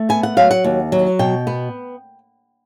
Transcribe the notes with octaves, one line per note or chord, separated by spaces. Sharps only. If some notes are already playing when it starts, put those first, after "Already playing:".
Already playing: A3
B3 G#5
F#5
F#3 F5
F#5
D#2
F#3
B2 G5
B3